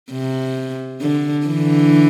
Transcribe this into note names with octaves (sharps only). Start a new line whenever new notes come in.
C3
D3
D3 E3